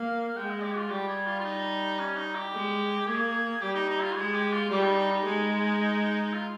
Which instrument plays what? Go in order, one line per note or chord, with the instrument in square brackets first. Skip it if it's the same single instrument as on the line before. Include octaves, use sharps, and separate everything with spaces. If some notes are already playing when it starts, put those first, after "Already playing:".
Already playing: [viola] A#3 [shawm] F5
[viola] G#3 [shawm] G5
[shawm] D#5
G4
F4
[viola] G3 [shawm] G4
[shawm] G#4
F4
F4
D#4
C#4
D#4
G4
[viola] G#3
[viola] A#3 [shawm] G#4
[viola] G3 [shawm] G4
[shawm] D#4
D#4
F4
[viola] G#3 [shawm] G#4
[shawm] G4
F4
[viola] G3 [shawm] G4
[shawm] D#4
D#4
D#4
[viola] G#3
[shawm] F4